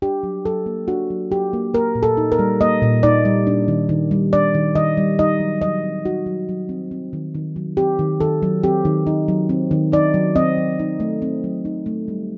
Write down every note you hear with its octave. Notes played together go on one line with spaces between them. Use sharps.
D4 G4
F#3
F#3 A4
A#3
D4 F#4
F#3
F#3 G4
A#3
A#3 A#4
A#2
A4
D#4
A#4
G3
A#3 D#5
A#2
D#4 D5
G3
D4
D#3
D#3
G3
D4 D5
D#3
D#3 D#5
G3
D#4 D#5
F#3
F#3 D#5
C4
D#4 F#4
F#3
F#3
C4
C4
D#3
D#3
F#3
C4 G4
D#3
D#3 A4
F#3
C4 G4
D#3
D#4
F#3
C4
D#3
D#4 D5
F#3
C4 D#5
F#3
D#4
A3
C4
F#3
D#4
A3
G3